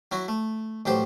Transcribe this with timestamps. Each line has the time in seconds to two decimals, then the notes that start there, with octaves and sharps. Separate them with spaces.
0.12 F#3 E4 F#4
0.28 A3
0.86 A1 F#3 G4 C5